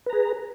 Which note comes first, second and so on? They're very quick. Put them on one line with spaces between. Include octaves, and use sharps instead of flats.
B4 A#5 G#4